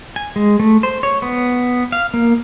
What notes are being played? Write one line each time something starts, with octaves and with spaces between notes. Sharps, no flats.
G#5
G#3
A3
C5
C#5
B3
F5
A#3